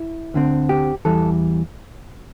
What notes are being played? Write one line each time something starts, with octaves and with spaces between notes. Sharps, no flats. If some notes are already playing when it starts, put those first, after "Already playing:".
Already playing: E4
D2 D3 C4
G4
E2 E3 G3 A4